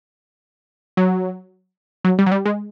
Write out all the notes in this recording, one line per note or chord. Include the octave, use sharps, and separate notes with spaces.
F#3
F#3
G3
F#3
G3
G#3